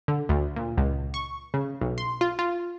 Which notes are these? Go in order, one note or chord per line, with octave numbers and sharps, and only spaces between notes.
D3
D2
A#2
C#2
C#6
C#3
B1
C6
F4
F4